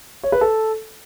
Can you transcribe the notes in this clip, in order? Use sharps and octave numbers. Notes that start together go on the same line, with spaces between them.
C#5
B4
A4